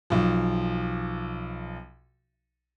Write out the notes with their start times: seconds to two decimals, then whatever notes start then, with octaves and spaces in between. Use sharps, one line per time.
0.10 B1 F3